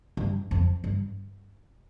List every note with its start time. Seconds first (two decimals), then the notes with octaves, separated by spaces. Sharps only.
0.17 G2
0.51 F2
0.84 G2